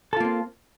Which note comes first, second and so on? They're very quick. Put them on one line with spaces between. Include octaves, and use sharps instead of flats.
A4 F4 A#3 C4